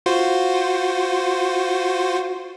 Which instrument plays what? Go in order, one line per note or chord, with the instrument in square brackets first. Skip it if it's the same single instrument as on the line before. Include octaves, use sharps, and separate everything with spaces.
[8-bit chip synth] F4 F#4 C5